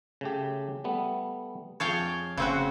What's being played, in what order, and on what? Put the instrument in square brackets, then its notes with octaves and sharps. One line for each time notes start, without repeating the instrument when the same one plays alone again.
[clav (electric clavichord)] C#3 A3 G4
G3 A3 B3
[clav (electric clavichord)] F2 G#4 A5 [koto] C#5 F5 G5
[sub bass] F1 [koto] C#3 C4 F#4